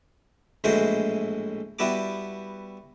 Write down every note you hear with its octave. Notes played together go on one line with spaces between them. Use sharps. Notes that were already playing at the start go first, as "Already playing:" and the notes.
A#1 A2 E3 G#3 F#4 C5
G3 B3 E4 F#4 A5 D6